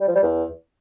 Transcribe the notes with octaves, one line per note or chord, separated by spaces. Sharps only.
G3
F3
G3
E2